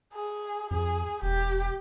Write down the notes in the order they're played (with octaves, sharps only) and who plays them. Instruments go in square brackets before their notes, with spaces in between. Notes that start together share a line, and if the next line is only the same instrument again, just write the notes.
[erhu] G#4
[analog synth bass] F2 [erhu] G#4
[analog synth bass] E1 [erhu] G4